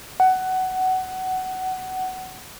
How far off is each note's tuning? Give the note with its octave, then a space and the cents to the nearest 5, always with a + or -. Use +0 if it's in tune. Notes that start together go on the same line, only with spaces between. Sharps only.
F#5 +15